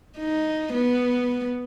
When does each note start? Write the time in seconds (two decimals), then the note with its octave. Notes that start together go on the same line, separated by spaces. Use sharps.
0.17 D#4
0.73 B3